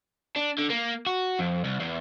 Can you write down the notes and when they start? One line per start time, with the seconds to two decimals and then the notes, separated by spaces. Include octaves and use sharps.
0.36 D4
0.58 D3
0.70 A#3
1.06 F#4
1.39 F2
1.65 C2
1.80 E2